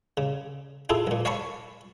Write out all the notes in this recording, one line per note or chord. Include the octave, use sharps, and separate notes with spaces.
C#3
E4 F4 G#4 A4
A#1 A#2
C#5 F5 G#5 A5 B5 C#6